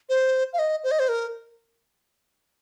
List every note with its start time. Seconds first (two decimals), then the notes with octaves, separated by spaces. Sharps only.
0.09 C5
0.53 F5
0.59 D#5
0.84 C5
0.91 D#5
0.99 C5
1.09 A#4